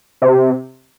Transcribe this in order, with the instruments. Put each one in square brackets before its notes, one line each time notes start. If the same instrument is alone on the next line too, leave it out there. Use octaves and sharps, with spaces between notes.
[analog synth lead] C3